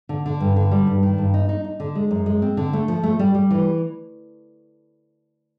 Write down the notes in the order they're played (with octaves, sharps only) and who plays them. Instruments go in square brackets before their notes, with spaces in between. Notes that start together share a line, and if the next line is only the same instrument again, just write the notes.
[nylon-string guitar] D3
D3
G2
D3
G3
G2
D#3
G2
D#4
D#4
D#4
D3
G#3
F#2
G#3
C4
D3
A3
F3
A3
G3
G3
E3